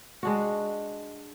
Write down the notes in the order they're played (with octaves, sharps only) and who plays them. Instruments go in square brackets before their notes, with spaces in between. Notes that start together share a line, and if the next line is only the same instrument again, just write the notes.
[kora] G#3 D4 F#4